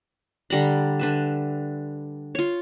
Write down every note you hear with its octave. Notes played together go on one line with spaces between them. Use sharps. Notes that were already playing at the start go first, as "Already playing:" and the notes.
D3 G3 A#5 B5
D3 B4 E5
F4 C#5